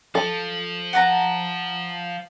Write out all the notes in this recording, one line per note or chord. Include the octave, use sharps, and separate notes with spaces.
F3 A4
F#5 A5 A#5